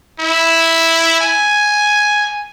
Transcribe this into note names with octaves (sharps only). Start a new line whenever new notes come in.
E4
G#5